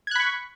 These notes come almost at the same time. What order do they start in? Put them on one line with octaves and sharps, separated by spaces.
G#6 F#6 B5 C#6